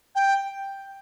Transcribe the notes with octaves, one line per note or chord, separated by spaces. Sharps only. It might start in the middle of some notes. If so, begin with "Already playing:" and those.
G5